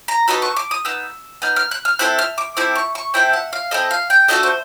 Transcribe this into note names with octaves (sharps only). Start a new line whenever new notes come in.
A#5
B3 D#4 F#4 A4 B5
C#6
D6
D#6
B3 D#4 E6
B3 D#4 F6
F6
F#6
F6
C4 E4 A4 F#6
F6
D6
C4 E4 A4 D6
C#6
C#6
C4 E4 A4 G5
F#5
F5
C4 E4 A4 D#5
F5
G5
A3 D4 F#4 A4 D#5
C5